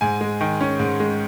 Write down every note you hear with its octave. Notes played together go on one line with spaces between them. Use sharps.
G#2 G#5
G#3
D#3
C#4
G#2
G#3